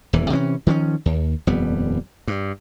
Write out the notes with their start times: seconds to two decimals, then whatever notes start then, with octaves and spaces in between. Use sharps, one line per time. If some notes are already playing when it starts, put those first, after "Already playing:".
0.13 D#1 E2 E3
0.30 C3 E3 B3 C#4
0.67 D#3 F3 G3 C#4
1.06 D#2
1.47 D#1 F2 G3 B3
2.28 G2